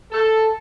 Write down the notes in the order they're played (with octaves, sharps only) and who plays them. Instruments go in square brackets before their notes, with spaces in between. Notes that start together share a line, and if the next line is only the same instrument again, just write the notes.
[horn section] A4